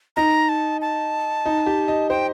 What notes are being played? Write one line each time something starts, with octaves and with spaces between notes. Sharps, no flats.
D#4 A#5
A5
A5
D#4
G4
D#5
C5 G5